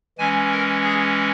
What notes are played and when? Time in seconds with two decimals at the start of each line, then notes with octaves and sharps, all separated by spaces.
0.18 E3 G#3 C#4 G#5
0.51 A#4
0.84 G#4